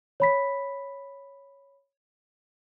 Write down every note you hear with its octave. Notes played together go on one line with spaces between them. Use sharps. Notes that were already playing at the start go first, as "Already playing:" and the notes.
C#5 B5 B6